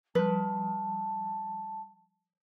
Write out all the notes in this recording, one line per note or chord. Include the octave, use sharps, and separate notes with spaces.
F3 G3 B4 A5